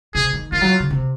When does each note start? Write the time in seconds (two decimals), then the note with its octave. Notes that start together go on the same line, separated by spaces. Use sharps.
0.14 C3 G#4
0.33 D#3
0.52 D#3 F4
0.61 F#3
0.80 C#3
0.90 C3